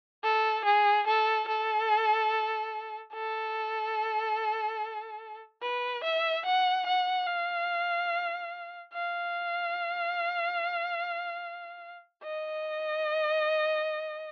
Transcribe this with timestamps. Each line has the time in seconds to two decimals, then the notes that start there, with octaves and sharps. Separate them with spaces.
0.23 A4
0.65 G#4
1.07 A4
1.48 A4
3.14 A4
5.62 B4
6.04 E5
6.45 F#5
6.86 F#5
7.27 F5
8.93 F5
12.24 D#5